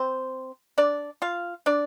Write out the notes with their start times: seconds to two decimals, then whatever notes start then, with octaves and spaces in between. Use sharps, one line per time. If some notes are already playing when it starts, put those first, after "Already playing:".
Already playing: C4 C5
0.78 D4 D5
1.22 F4 F5
1.66 D4 D5